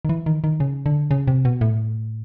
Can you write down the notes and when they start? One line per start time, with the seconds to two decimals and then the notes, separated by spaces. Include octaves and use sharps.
0.05 D#3
0.09 E3
0.26 D#3
0.44 D#3
0.60 C#3
0.86 D3
1.11 C#3
1.28 C3
1.45 B2
1.61 A2